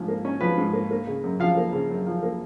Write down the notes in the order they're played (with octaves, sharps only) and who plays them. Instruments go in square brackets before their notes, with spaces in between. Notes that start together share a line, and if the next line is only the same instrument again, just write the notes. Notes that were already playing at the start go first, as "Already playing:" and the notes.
Already playing: [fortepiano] G#2 F3
A#3
C#4
F3 B4
G#2
A#3
A#3
C#3
F#2
F3 F5
A#3
C#3
F#2
F3
A#3